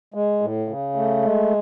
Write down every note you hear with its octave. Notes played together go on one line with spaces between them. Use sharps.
G#3
A2
C#3
A3
G#3